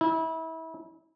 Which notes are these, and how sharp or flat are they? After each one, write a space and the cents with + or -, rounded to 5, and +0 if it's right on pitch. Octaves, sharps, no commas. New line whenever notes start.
E4 -30